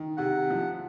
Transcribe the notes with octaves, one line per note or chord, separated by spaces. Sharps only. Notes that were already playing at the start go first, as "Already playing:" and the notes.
Already playing: D#3
C3 F#5
F3